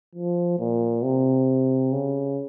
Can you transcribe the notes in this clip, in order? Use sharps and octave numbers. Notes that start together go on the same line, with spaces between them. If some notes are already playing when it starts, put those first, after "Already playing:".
F3
A#2
C3
C#3